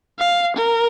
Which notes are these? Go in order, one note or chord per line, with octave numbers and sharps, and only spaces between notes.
F5
A#4